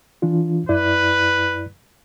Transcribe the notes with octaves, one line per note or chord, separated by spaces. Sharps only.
E3 D4 F4
F#2 E4 B4 D5